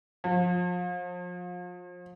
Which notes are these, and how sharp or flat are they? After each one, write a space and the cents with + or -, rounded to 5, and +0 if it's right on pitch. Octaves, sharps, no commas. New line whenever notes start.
F3 +30